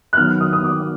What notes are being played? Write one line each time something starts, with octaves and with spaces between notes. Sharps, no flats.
F#6
D#3 F#3 B3 F6
D#6
D#6
D6